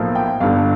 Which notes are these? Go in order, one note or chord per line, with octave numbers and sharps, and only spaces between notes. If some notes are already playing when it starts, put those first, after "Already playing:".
Already playing: B1 A2 F3 A#3
G5
G1 G2 D3 F5